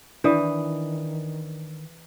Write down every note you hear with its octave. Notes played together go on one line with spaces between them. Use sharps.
D#3 E3 D4 D5 D#6